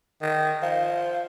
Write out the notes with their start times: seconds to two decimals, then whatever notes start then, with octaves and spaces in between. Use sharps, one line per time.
0.22 D#3
0.62 F3